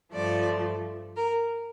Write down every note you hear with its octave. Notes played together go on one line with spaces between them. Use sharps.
G2 F3 A3 D5
A#4